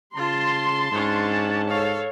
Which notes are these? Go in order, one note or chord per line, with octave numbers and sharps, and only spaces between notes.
C#3 F4 A5 C6
G#2 C#4 D4
A4 C#5 F5